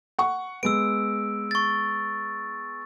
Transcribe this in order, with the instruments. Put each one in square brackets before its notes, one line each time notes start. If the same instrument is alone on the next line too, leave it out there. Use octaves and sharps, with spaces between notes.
[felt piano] F#5 C#6
[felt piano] G#3 B3 [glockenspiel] E6 D7
[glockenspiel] C#6 A6